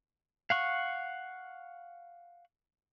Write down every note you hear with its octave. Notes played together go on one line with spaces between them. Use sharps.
F5 F#5 C#6